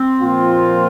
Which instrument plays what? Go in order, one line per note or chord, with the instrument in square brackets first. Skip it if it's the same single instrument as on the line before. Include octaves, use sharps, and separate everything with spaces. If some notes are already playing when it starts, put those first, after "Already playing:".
Already playing: [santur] C4
[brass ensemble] A#2 F3 A#3 F4